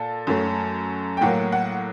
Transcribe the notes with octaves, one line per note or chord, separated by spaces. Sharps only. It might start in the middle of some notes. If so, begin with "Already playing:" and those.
Already playing: A#2 A4 A5
F#2 F#3 A3
G5
A2 F#3 A#3 F#5
F#5